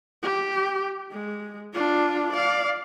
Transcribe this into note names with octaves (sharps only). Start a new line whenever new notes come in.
G4
G#3
D4 F4
D5 F5